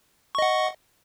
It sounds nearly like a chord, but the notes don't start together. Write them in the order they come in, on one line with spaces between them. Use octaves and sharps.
C#6 D#5 F#5